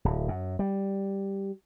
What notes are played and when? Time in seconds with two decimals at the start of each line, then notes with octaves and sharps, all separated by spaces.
0.05 D1
0.28 F#2
0.59 G3